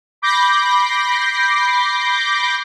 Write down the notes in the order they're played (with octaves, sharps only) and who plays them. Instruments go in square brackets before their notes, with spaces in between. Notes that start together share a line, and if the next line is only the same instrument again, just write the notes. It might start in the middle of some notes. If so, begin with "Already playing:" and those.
[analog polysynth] B5 D6 G6 A#6 C7